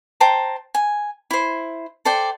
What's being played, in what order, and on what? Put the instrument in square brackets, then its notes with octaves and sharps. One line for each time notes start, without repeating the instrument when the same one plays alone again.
[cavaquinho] C5 G5 A5 A#5
G#5
E4 C5
A4 C5 D5 G5